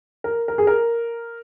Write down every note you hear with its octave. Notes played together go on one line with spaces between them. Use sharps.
A#4
A#4
G#4
A#4